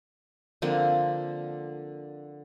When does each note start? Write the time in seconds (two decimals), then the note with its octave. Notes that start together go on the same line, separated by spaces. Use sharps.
0.62 D3 F3 A#3 C4